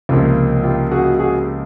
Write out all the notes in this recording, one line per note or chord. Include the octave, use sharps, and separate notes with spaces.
C#2 C3 F3 A#3 F4
F4 G4
F#4 G#4
F#4 G#4